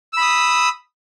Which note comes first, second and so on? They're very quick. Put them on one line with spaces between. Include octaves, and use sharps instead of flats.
E6 B5 D#6